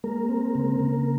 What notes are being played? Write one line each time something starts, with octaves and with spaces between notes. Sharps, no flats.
G#3 A#3 A#4
C4
C#3
C#3